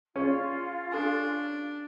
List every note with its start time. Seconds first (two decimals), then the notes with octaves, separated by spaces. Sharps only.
0.16 C#4 F4 G#4 D5
0.92 D4 G4 A4 G#5